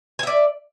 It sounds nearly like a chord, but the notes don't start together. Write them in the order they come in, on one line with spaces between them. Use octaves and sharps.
G#5 E5 D5